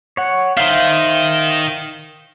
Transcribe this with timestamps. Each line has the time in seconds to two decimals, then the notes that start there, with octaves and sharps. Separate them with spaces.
0.17 C#5 F#5
0.57 D#3 C5 E5 F5